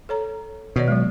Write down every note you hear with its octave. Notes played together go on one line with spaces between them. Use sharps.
A4 C#5 A#5
B2 D#3 C#5 D5
F#3 G#3